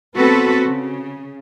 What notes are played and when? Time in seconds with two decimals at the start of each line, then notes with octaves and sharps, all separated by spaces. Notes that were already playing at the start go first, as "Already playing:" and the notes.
0.15 B3 C4 F#4 A4 B4
0.64 C#3